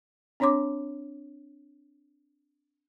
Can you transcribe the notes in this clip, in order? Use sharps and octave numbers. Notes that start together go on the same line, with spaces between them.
C4 D4 C#5 C6 D6